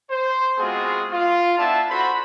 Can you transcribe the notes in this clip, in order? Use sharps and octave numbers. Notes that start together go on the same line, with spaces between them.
C5
G#3 B3 C4 F4 F#4 G#4
F4
B3 D4 E4 D5 E5 A5
F#4 A4 C5 B5